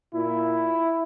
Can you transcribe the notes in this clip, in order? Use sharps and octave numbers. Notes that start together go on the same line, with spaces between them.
A#2 E4